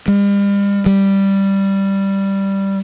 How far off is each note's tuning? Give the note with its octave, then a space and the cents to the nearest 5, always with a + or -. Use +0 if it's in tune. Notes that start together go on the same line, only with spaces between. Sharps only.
G3 +40
G3 +0